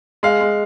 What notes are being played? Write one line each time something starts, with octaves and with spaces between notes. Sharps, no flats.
G#3 F5
G#3